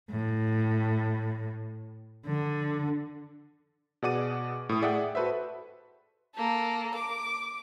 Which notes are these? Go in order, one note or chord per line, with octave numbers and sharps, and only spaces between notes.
A2
D3
B2 G#4 D5 F#5 D6 D#7
A2 D#6
G#4 D5 E5 F#5 G5
F#4 A4 B4 C5 E5
A#3 A4
D6